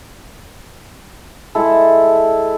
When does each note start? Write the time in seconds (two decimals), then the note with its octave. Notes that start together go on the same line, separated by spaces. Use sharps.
1.55 G#3 E4 A4